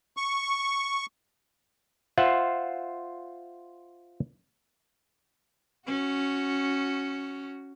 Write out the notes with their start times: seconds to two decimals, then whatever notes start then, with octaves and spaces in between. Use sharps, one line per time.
0.17 C#6
2.18 F4 C5 E5 F#5
5.87 C#4 F#4